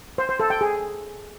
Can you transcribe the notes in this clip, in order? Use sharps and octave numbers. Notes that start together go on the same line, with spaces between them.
C5
C5
A4
G5
G#4